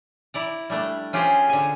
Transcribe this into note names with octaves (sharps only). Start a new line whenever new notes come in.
E4 D5 A#5
G3 A3 D4
C#4 F4 G4 G#4 C5
D3 G#5